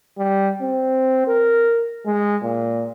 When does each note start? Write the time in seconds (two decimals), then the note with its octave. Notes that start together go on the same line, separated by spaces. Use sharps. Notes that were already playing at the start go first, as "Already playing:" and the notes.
0.18 G3
0.61 C4
1.28 A#4
2.06 G#3
2.43 A#2